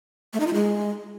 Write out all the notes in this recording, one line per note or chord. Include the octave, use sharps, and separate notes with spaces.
A3
D#4
F4
G#3